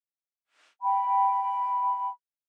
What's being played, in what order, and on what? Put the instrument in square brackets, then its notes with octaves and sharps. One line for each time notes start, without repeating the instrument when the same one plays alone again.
[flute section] G5 B5